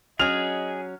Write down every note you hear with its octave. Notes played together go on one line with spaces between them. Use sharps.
F#3 C#4 G#4 D#5 F6 F7